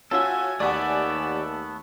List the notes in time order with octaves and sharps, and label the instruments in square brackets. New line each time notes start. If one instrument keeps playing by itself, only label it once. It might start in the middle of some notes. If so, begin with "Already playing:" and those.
[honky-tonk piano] C#4 F4 F#4 [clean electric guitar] A4 E5 [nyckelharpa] G#5
[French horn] D#2 [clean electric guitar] A3 B3 [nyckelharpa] G4 E5 [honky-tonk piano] D5 F#5 G#5